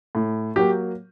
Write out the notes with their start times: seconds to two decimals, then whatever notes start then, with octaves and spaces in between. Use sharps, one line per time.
0.15 A2
0.56 F#3 A#3 G4